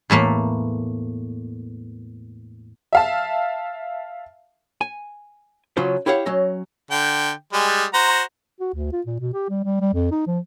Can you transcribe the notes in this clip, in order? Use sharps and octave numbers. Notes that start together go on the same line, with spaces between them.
E2 A2 A3 A#3
E5 F5 A5
G#5
C#3 F#3 C#4 F4 C5
E4 G4 C#5 F5 F#5
F#3 C#4 D#5
D3 G5
G3 G#3
F#4 C5 A#5
F#4
D2
F4
A#2
B2
G4
G3
G3
G3
F2
D#4
F3